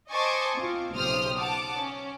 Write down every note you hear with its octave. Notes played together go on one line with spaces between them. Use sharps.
C5 D#5 G#5 A5 C#6 D6
C4 F4
B1 C#3 G4 C5 D#6 F6
F#5 A5 D6
C#4